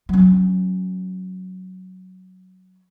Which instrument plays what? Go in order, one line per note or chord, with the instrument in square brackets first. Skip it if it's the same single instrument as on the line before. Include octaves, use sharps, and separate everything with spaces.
[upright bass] F#3 C#4